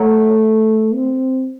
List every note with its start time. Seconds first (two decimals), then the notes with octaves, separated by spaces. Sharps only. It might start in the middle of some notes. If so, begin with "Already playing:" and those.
Already playing: F#3 A3
0.94 C4